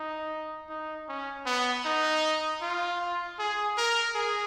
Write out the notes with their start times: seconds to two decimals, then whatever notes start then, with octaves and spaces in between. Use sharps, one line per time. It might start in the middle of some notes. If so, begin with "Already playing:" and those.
Already playing: D#4
0.69 D#4
1.09 C#4
1.46 B3
1.85 D#4
2.62 F4
3.39 G#4
3.77 A#4
4.15 G#4